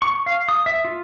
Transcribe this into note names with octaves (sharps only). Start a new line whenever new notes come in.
C#6
F5
D#6
E5
F4